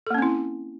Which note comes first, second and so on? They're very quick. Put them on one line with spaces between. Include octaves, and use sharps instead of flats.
A4 A#3 C#4 C4 E4